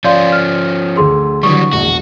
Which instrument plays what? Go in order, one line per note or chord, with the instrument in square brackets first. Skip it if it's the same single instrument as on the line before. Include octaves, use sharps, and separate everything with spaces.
[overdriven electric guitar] F3 C#4 [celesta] D5 F5 C6 [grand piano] G6
[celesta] F6
[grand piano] D2 A4 [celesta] G#4 C6
[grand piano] D3 E3 D#6 [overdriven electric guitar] F#3 G3 [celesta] C#6
[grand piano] E1 A#1 [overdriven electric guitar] F#4